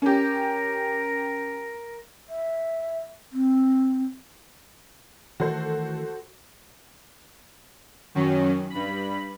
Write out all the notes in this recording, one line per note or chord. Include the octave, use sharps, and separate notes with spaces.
C#4 G4 A#4
E5
C4
D#3 E3 A3 F#4 A4 C5
F#2 D#3 F#3 C#4
G2 B5